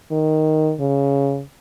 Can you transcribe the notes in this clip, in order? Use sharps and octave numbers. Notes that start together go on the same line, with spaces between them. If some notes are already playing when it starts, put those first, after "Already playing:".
D#3
C#3